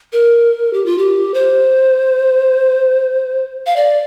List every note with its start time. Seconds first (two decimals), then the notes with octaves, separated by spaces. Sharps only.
0.13 A#4
0.73 G4
0.86 F4
0.98 G4
1.34 C5
3.66 F5
3.76 D5